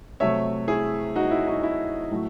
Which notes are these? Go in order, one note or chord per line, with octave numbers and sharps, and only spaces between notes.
C3 F#3 A3 C#5 E5
E4 G#4
D#4 F#4
E4
D#4 F#4
E4
A2 F#3 A3